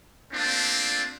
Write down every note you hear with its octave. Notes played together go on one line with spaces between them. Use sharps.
A3 A#3 C4 D4 F4